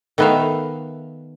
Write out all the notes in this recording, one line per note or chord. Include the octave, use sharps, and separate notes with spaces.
D#3 A3 B3 B4 E5 F5